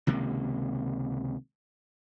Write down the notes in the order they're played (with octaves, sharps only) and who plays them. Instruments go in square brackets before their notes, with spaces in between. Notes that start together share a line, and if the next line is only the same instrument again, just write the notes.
[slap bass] C#2 C3 D#3 A#3